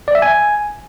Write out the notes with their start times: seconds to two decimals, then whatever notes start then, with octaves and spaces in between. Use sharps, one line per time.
0.08 D5
0.15 E5
0.22 G#5